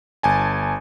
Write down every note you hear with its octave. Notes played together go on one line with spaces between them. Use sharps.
G1 G#5 A5